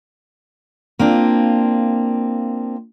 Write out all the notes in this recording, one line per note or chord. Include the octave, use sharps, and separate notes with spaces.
A#3 C4 D4 F4